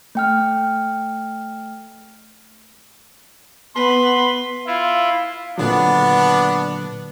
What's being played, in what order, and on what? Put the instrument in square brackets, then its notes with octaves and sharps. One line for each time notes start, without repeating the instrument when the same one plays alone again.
[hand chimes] A3 G5 F6
[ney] B3 [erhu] B4 [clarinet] C6
[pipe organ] E4 F4 [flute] F5
[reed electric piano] A#2 D3 F#3 [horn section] B3 D4